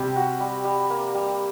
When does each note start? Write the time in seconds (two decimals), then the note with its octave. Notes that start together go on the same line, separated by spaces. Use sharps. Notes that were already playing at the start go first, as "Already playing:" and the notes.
Already playing: C3 G3
0.16 F#4
0.40 G3
0.64 G3
0.90 A#3
1.14 G3